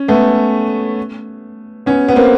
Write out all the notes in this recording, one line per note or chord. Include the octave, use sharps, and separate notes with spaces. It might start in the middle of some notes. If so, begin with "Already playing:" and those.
Already playing: C#4
A3 B3
B3 C#4
B3
A#3 C4